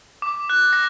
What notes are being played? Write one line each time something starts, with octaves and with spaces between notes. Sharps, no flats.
D6
F#6
A#6